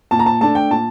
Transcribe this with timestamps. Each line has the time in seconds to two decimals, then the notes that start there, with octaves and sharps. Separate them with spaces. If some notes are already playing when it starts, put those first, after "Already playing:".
0.11 A#2 A5
0.19 A#5
0.26 A5
0.41 A3 D4 A5
0.55 G5
0.71 A#2 A5